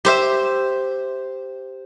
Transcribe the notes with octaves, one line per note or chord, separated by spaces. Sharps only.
G4 C5 E5